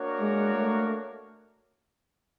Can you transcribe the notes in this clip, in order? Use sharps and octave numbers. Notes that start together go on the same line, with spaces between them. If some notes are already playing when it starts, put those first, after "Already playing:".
Already playing: A#3 D4 F#4 A#4 C#5
G#3
A3